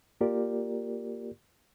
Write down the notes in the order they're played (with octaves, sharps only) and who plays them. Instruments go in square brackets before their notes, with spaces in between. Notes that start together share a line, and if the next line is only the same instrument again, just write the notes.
[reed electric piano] A#3 F4 G4 A#4 D5